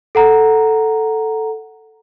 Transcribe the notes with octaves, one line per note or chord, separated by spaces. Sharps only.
A4 F#5 A#5